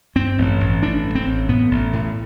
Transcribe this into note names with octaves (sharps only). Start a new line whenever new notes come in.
G2 C4
A1
A1
A1 D4
G2
C4
A1
A2 B3
A1
A2